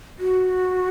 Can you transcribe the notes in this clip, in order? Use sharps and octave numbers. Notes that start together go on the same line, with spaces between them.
F#4